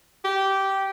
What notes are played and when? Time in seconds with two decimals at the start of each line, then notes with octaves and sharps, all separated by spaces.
0.25 G4